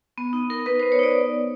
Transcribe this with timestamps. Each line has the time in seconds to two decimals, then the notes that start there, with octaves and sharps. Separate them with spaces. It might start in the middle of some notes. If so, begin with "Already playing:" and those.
0.18 B3
0.33 D#4
0.50 D#4 A#4
0.66 B3 B4
0.80 C5
0.82 B3
0.92 C#5
0.99 D#4 D5